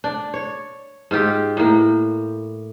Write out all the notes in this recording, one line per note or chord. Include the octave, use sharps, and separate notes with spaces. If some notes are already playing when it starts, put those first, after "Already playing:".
D4
C#5
G#2 F4 G4
A2 A#3